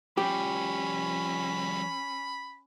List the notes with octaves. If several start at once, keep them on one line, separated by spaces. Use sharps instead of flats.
F3 G3 C#4 G4 B5